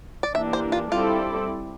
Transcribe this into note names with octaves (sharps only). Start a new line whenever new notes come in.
D5
E3 A#3 D4 G4 E5
C5
F4
G3 C4 E4 F4 A4 D5